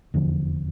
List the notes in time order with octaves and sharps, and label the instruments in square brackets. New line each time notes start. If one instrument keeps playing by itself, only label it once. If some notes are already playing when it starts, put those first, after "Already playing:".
[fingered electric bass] F1 E2 D3 F3